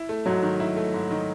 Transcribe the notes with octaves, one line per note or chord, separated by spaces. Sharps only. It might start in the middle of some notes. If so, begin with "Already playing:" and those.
Already playing: E4
A3
G#2 F#3
D#3
E4
A3
G#2
D#3